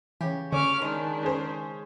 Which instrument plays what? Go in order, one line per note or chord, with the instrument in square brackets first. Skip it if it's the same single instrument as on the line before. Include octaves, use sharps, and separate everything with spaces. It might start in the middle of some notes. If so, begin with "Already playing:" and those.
[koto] C#3 G4 [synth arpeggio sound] E3
[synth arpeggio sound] D3 [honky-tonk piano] C#4 [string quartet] C#6 D6 F6
[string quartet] D#3 D4 [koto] G#3
[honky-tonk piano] C#4 G#4 C5